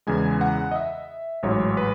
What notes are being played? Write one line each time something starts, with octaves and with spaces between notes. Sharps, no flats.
E2 C#3 E3 G#3 G#5
F#5
D#5
E5
A1 G#2 F#3 C#5
B4